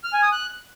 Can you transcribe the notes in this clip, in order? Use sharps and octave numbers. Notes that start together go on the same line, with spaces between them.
F6
G#5
D#6
F#6